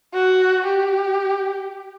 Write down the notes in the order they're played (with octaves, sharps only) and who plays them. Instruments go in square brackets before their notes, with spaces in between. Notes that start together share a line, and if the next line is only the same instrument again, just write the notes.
[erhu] F#4
G4